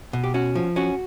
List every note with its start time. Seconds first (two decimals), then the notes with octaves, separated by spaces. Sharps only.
0.13 B2
0.24 G4
0.34 C#4 F#4
0.55 F3
0.76 C#4 F#4